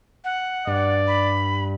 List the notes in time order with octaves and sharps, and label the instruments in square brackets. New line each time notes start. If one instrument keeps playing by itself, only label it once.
[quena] F#5
[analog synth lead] G2 [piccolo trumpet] D5
[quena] B5